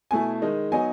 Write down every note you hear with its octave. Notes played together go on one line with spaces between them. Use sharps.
B2 A3 E4 G#5
D#3 G#3 D#4
F#3 B3 D#4 G#5